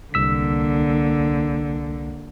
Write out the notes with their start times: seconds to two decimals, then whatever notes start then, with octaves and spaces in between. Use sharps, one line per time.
0.14 C2 D3 A#3 E6 B6